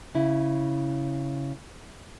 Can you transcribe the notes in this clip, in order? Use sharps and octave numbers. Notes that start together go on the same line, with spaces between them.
C#3 E4